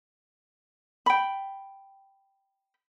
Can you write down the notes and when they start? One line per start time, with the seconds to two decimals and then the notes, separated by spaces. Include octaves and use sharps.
1.06 G5 B5